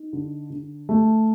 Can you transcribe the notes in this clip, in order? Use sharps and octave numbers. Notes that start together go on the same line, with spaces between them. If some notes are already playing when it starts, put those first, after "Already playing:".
Already playing: D#4
D3
D3
A3